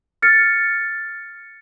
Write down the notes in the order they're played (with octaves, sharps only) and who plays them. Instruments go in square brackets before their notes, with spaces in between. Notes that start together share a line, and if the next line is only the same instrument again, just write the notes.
[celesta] F6 A6 C#7